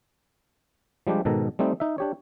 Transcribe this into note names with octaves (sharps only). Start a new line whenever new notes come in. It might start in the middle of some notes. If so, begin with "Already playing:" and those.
F3 G3 G#3 D4 G4
G#2 B2 D#3 A4 A#5
G3 A3 C4 D#4
D#4 E5
D4 G4 C#5